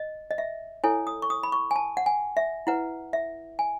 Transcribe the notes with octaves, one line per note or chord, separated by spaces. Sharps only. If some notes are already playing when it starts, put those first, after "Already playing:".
Already playing: D#5
D#5
E5
E4 A4 C#5 G#5
D#6
C#6
D#6
B5
C#6
G#5
A5
F#5
G#5
E5
E4 B4 F#5
E5
G#5